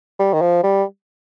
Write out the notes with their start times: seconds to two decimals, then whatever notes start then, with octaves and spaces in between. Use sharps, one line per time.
0.19 G3
0.33 D#3
0.41 F3
0.63 G3